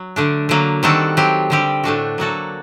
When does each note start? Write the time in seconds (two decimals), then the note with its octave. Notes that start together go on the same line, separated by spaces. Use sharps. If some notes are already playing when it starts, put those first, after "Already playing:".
Already playing: F#3
0.16 D3 A3 D4
0.49 D3 F#3 A#3
0.83 D#3 G3 C4 F#4 A4
1.17 F#3 C4 G4
1.50 D3 G3 C4 G4
1.84 A2 A3 D4 F#4
2.18 F#3 A#3 F#4 A4